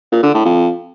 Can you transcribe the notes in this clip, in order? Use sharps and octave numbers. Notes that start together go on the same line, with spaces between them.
A#2
D3
A2
F2